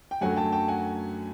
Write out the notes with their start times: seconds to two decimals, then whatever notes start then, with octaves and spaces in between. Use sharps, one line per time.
0.11 G5
0.21 F#2 D3 F#3 A3 F#5 G#5
0.36 G5 A5
0.52 G5 A5
0.68 F#5 G#5